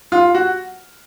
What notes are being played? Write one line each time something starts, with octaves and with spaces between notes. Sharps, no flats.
F4
F#4